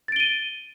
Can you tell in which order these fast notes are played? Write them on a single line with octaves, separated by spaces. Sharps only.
A6 D7 G7 D#7